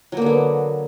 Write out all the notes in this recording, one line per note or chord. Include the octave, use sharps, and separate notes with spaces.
D3 F#3 A#3 B3